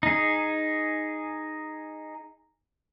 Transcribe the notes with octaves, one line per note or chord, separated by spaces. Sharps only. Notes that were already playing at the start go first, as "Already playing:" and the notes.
D#4 G#4